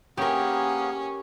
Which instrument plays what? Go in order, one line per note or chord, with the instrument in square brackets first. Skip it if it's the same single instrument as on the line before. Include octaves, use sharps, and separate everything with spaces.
[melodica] A#3 B3 G#4 [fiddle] C#4 [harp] G4 A#4